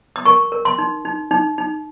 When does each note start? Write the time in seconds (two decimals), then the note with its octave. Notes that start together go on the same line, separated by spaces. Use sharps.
0.16 D#6
0.26 A#4 C#6
0.52 A#4
0.65 C6
0.78 D#4
1.05 D#4
1.31 D#4
1.58 D#4